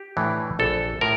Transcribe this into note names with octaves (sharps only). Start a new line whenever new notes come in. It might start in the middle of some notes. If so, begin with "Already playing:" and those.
Already playing: G4
A2 E3 A3 D4
A#1 A4
A2 A#4